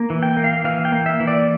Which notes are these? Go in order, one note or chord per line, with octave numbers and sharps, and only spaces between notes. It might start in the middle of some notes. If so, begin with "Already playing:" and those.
Already playing: A#3
E3
G5
A#3
F5
E3 F5
G5
A#3
E5
E3
D5